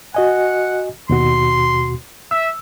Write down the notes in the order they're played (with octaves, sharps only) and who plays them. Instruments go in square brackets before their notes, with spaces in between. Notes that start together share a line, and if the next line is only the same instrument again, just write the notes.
[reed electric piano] F#4 D#5 G#5 [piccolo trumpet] F#5
[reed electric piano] D#2 B2 F#4 [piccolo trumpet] C6
[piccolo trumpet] E5 [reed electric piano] E6